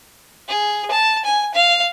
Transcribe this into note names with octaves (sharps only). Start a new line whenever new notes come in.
G#4
A5
G#5
F5